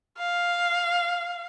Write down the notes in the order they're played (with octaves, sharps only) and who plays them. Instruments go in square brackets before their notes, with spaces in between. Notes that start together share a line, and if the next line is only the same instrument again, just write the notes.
[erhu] F5